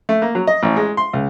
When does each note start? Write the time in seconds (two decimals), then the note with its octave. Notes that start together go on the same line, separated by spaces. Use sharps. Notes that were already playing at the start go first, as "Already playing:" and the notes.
0.09 A3
0.22 A#3
0.35 F#3
0.47 D#5
0.63 A1
0.76 G#3
0.97 C6
1.13 C#2